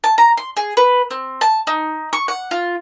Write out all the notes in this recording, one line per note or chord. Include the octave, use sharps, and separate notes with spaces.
A5
A#5
C6
G#4
B4
C4
A5
D#4
C#6
F#5
F4